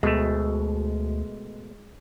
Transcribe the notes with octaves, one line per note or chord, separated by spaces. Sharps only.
D2 B2 G#3 A3